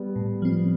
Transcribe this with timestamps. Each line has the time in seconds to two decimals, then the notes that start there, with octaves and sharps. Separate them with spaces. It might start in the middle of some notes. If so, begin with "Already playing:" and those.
Already playing: G3 B3
0.16 A2
0.42 F3 C4